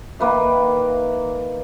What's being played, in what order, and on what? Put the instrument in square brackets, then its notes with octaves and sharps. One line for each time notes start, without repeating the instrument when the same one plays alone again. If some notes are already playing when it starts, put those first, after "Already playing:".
[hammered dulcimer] D#3 A#3 B4 E5